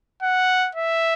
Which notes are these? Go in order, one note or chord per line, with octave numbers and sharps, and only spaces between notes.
F#5
E5